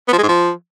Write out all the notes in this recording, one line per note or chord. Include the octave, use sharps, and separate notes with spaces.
B3
F3
G#3
G#2
F3